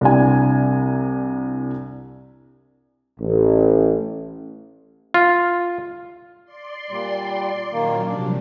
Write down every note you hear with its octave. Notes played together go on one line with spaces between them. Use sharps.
C2 C3 D4 E4 G#5
A1
F4
D5 C6
A#2 G3
A#2 D#3 F#3 A#3 C#4
C3 F3 G3 D4